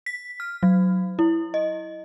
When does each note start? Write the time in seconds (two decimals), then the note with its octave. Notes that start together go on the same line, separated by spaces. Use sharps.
0.06 B6
0.40 F6
0.63 F#3
1.19 E4
1.54 D#5